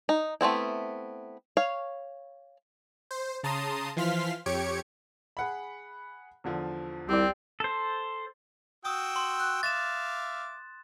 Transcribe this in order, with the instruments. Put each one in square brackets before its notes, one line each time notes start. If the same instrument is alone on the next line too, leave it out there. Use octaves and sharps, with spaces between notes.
[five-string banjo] D#4
A3 B3 C4 E4
C#5 F5
[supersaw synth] C5
C#3 A5 A#5 C6 D#6
E3 F3 F5 C6 F6 B6
F2 G4 C#5 G#6 C#7 D7
[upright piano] G#4 F#5 B5
E2 D3 F3
[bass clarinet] C2 [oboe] C4 [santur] G4 D5
[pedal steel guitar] A4 C5
[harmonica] F#4 G5 E6 [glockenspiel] D#6
[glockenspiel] C6
F#6
[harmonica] E5 F5 D6 [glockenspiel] A6 E7